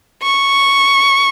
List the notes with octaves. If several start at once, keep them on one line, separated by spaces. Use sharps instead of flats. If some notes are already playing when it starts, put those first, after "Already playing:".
C#6